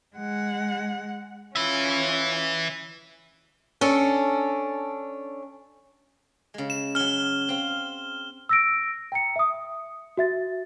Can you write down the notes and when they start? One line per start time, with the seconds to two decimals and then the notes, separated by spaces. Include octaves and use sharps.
0.16 G#3 F#5
1.56 C#4 F4 B4 E5
3.81 C#4 D4 A4
6.54 C#3 G#3
6.70 E7
6.95 F#3 C#4 F6 G7
7.49 C4 F5
8.49 E6 A#6 D7
9.12 G5 A#5 C#7
9.36 E5 D#6
10.17 F#4 E5 A6